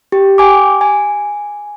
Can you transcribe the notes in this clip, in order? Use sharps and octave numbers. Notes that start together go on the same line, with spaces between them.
G4
G5 G#5 D6
G#5